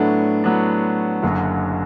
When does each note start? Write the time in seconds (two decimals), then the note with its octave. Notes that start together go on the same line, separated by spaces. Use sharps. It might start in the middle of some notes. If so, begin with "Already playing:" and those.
Already playing: A2 F#3 A3 B3 D4
0.44 A2 F#3 B3 D4
1.23 F#1 F#2 D3 F#3